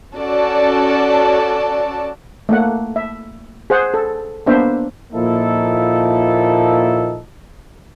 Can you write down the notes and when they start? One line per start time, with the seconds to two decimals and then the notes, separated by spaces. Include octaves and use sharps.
0.15 C#4 F#4 A4 D5 A5
2.49 A3 A#3 F#5
2.96 E5
3.70 G#4 C5 F#5
3.94 A4
4.46 A#3 B3 D4 C5 E5
5.13 A#2 F3 A#3 D#4 E4 A4